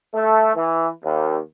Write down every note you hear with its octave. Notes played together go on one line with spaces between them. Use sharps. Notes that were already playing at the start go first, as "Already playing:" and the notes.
A3
E3
D#2